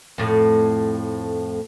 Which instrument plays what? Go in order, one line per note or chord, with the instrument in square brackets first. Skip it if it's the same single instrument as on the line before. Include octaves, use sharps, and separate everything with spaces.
[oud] F2 A2 A3